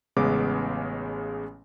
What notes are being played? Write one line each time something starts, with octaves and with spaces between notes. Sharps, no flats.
A1 C#3 G#3 B3 D6